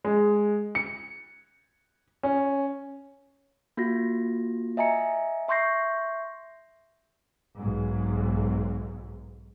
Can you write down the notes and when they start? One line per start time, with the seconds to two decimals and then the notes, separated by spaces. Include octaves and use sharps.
0.04 G#3
0.75 C#7
2.23 C#4
3.77 A#3 F4 F#4 A#6
4.77 D#5 E5 G#5 A#5 C#7
5.48 E5 C6 C#6 G6 A#6 C7
7.57 B1 G#2